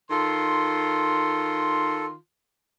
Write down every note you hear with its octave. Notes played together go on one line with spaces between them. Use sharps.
D#3 F4 A4 C6